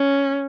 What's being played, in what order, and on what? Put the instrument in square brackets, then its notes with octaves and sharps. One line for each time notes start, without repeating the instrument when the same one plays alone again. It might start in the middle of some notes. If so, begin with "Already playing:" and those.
Already playing: [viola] C#4